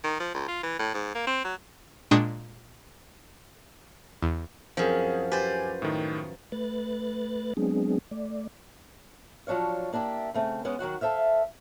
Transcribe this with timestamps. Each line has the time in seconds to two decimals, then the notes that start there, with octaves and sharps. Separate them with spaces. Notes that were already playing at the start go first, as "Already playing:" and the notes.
0.04 D#3
0.20 F3
0.34 C#2
0.48 F4
0.63 E3
0.79 A2
0.94 G#2
1.15 A#3
1.27 C4
1.44 F#3
2.11 A#2 G#3 D4 G5 C#6 D#6
4.22 E2
4.77 F#2 F3 C4 G#4
5.32 G4 B4 C5 G#5 A6
5.82 A2 D#3
6.52 A3 B4 F#6 A6
7.57 F#3 G#3 B3 C4 D4 G#4
8.11 A3 D5
9.47 F3 F#3 D4 C#5 F5
9.93 A#3 D4 E4 G4
10.34 C#3 A3 C4
10.65 G#3 B3 C#4
10.79 D#3 F#3 F#4 F#5
11.01 A4 C5 E5 F5